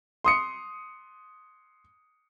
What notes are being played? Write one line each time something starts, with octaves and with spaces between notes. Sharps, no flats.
C6 D#6 C#7